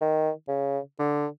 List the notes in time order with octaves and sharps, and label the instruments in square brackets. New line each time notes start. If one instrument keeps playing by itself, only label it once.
[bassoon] D#3
C#3
D3